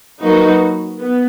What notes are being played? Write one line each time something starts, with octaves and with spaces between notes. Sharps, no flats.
F#3 A#3 D#4 F#4 B4
B3